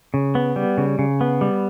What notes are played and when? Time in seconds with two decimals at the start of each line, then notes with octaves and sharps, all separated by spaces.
0.14 C#3
0.35 B3
0.56 G3
0.78 C#3
0.99 C#3
1.21 B3
1.41 G3